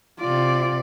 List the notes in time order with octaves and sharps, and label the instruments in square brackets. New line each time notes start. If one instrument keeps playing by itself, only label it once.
[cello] C3 D5 [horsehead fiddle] F4